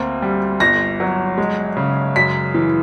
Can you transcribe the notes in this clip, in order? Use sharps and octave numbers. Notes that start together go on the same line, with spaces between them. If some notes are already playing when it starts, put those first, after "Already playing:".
Already playing: D2 A#3 C4
G3
G1 A#6
F#3
G#3
C#3
F#2 B6
E3